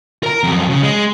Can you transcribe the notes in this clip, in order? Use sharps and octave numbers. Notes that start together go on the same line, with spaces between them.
A#4 A#5
F2 F#3
C#3
G#3